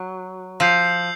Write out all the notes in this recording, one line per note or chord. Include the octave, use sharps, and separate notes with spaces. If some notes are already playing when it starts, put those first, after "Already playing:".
Already playing: F#3
F3 E6 G6 C7 F7